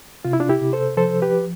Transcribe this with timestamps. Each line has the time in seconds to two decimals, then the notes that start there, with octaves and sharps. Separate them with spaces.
0.25 C3 F4
0.33 E4
0.40 D4 F4
0.49 E4 G4
0.61 C3
0.73 A4 C5
0.97 F3 A4 C5
1.22 G4 B4